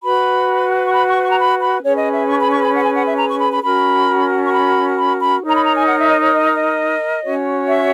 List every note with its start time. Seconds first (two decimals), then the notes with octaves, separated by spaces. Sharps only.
0.03 F#4 B4 B5
0.86 C#6
0.93 B5
1.09 C#6
1.23 C#6
1.31 A#5
1.39 B5
1.61 B5
1.83 C#4 G#4 B4 C#5
1.98 D#5
2.12 E5
2.28 C#6
2.39 B5
2.51 C#6
2.62 B5
2.75 F#5
2.84 G#5
2.96 F#5
3.07 E5
3.18 A#5
3.29 C#6
3.40 B5
3.52 B5
3.63 C#4 F#4 A#4 B5
4.46 C#6
4.52 B5
4.97 B5
5.20 B5
5.43 D#4 A#4 C#5 A#5
5.55 B5
5.65 A#5
5.77 G#5
5.88 F#5
5.99 E5
6.10 D#5
6.21 C#5
6.33 D#5
6.56 D#5
7.22 C#4 F#4 C#5
7.67 E5